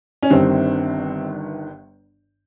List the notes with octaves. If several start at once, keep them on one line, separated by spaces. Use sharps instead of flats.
C#4
G1 G2 D#3 C4